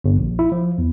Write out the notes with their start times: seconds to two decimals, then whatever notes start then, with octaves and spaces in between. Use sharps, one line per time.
0.04 G1
0.18 A#1
0.39 E4
0.52 F3
0.78 E2